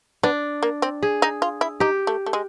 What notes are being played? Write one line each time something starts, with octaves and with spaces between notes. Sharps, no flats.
B3 D4
A#3
C4
G#4
D#4
F4
E4
D#4 G4
A3
A3
G#3